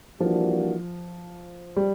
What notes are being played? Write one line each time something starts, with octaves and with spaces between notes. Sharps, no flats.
E3 F3 G3 A#3 D4 F#4
G3